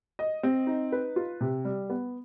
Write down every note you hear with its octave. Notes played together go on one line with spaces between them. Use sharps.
D#5
C4
D#4
B4
F4
C3
G3
B3